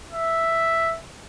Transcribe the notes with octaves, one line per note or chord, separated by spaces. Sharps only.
E5